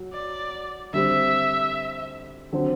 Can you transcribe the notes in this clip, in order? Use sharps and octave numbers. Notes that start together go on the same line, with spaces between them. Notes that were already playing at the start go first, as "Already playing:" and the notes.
Already playing: F#3
D5
D3 G3 C4 E5
D3 F#3 C4 F#4